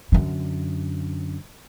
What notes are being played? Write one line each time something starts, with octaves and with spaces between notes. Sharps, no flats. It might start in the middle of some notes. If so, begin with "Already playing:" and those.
F#2 D3